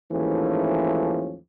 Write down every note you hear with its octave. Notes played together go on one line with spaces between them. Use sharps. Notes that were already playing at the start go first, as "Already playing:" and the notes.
D#2 G#2 E3 F3 A3 C#4